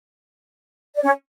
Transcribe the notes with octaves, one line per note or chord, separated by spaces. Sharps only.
D5
C#4 C#5